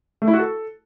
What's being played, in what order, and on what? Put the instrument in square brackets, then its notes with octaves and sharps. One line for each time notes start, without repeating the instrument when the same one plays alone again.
[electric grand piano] A3
E4
F#4
A4